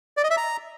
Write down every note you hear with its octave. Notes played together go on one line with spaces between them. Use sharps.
D5
D#5
E5
A#5